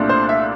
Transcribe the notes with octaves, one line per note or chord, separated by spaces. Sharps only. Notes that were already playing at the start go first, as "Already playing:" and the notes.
Already playing: C2 A#2 A3 D4 F4
C5
E5